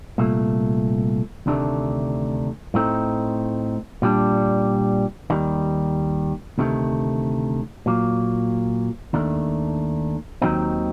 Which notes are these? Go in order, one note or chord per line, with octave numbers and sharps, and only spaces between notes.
C2 A#2 A3
D2 C3 D#3 A3 D4
A2 A3 C4 D#4
A#2 G3 D4
D#2 D#3 G3
D2 C3 D#3 A3
A#2 F#3 A#3
D#2 D#3 A3 D4
D#2 D#3 F#3 C4 D#4